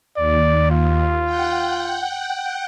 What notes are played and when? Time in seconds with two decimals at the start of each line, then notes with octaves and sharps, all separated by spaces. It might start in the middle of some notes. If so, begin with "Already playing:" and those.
0.17 D#2 D5
0.71 F4
1.25 F#5 G5